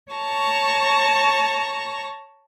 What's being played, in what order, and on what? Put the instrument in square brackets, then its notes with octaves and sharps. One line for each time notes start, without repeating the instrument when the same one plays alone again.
[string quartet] C#5 A5 A#5 C#6